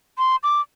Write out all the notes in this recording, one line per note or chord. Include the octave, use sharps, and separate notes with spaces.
C6
D6